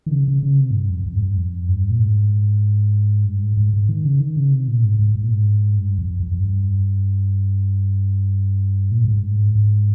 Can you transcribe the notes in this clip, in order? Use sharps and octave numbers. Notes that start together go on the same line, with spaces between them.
D#3
C#3
C#3
C#3
C3
G#2
G2
F2
F2
G#2
G2
F2
G2
A#2
G#2
G2
G#2
G#2
G#2
D#3
C#3
D#3
C#3
C3
A#2
G#2
G#2
G#2
A#2
G#2
G2
F2
F2
F2
G2
A#2
G#2
G2
G#2
G#2